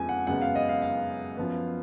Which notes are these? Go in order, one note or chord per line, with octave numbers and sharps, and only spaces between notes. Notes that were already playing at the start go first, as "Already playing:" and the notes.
Already playing: F2 C#3 F3 G#3 B3 G#5
F#5
F#2 C#3 G#3 B3 F#5
F5
D#5
F5
F5
F#2 F3 B3